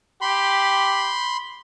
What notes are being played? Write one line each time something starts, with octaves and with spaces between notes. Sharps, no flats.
G4 B5 C6